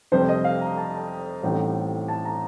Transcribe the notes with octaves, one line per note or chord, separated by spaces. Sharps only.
F1 F2 C3 G3 C5
D#5
F5
A#5
A5
A1 A2 G3 C4 D#4
A5
A#5